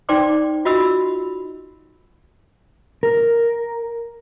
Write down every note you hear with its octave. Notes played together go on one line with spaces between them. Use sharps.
D#4 C5 D5 G5 C6 D6
F4 F#4 D#5 B5 E6
A#4